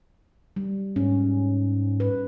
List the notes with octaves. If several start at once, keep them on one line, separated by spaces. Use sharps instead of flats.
G3
G#2 C#4
B4